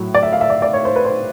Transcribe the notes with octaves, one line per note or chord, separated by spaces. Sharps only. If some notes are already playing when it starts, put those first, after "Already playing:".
Already playing: A2 F#3
D5
E5
F5
E5
D5
D5
C#5
C5
B4
C5